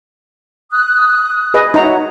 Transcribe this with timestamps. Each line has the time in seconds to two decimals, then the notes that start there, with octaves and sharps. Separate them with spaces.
0.71 D#6 F#6
1.54 G#4 B4 D#5
1.74 D#4 F#4 C#5 E5 A#5